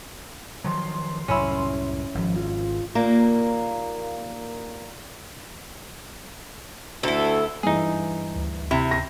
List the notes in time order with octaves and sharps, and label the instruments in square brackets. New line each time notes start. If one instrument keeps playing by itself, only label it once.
[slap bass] D#3 F3 F#3 [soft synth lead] C6
[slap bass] C2 F#2 A2 [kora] C#4 E4
[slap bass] G#1 [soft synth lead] F3
[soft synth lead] F4
[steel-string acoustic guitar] D#2 A#2 A#3 A#5
[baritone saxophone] D2 [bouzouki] E4 A4
[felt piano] G2 E3 [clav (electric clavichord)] D#4 G#4
[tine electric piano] D2
[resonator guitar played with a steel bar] C3 [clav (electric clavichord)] E4
[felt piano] A#6